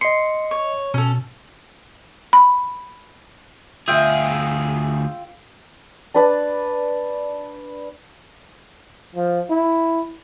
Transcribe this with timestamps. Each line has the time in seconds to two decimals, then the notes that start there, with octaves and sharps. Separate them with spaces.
0.01 D#5 C6 C#7
0.51 C#5
0.94 B2 C#4 A4
2.33 B5
3.88 D2 F4 G#4 E5 G5
6.14 D4 B4 A5
9.15 F3
9.50 E4